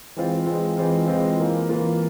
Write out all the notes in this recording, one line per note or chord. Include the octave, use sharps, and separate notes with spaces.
E3 G#3 C4 F4
E3 G#3 C4 F4
E3 G#3 C4 F4
E3 G#3 C4 F4
E3 A#3 F4
E3 A#3 F4